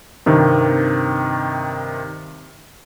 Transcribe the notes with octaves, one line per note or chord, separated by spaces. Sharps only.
G2 C3 D#3